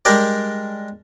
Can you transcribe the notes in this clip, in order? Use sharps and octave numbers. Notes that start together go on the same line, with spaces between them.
G3 G#3 D4 G4 A#4 D5